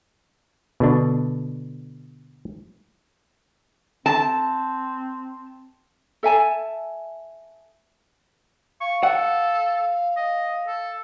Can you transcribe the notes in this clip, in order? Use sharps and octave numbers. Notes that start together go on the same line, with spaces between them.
B2 D3 D4
C4 A5
A4 E5 G#5 A5
F5 C#6
A4 F#5
D#5
A4